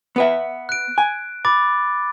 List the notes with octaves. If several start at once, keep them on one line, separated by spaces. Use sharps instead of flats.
B3 B4 E5
F#6 D7
G#5
B5 D6 A6